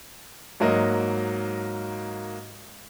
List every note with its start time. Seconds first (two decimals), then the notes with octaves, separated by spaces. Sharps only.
0.60 G#2 F#3 A#3 D#5